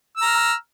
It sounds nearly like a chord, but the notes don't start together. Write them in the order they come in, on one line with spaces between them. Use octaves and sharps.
E6 A#5 F6